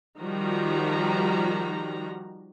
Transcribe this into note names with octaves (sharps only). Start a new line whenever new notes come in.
D#3 F3 G3 F#4 A#5